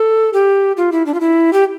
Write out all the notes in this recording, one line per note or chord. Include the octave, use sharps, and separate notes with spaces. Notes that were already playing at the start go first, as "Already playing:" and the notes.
Already playing: A4
G4
F4
E4
D4
F4
E4
G4